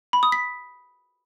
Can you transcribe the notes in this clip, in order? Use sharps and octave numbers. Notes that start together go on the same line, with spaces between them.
B5
D#6
B6